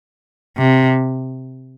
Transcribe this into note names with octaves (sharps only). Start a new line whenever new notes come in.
C3